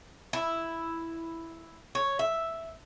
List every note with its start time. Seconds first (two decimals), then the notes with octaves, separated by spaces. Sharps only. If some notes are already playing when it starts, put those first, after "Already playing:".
0.33 E4
1.95 C#5
2.19 E5